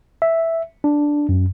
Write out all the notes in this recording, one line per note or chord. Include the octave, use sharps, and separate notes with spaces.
E5
D4
F#2